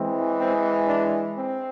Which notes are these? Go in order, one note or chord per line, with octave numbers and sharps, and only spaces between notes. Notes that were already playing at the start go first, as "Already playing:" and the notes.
Already playing: E3 G#3 C4
C4
D4
C4